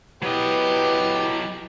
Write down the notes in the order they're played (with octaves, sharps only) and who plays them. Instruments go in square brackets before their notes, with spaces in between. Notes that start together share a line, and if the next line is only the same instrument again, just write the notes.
[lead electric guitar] F#3 D#5 [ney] E4 [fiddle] G4 [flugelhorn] B4